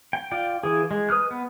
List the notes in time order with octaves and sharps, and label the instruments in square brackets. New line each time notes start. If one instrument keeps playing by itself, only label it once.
[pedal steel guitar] G5
F4 D5 G5
E3 G#4
G#3
B4 D#6 F6 F#6
B3